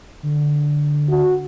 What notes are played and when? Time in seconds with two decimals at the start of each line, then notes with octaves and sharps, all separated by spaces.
0.23 D3
1.10 F#4